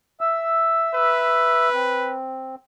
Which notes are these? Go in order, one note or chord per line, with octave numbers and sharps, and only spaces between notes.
E5 E6
B4
C4